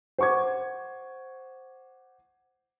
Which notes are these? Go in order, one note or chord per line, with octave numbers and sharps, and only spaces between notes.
C5 F#5 C#6 D6 G#6